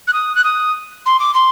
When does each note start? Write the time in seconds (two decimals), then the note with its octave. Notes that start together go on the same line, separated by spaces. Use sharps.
0.08 F#6
0.13 D#6
0.35 F#6
0.44 D#6
1.06 C6
1.20 D6
1.34 C6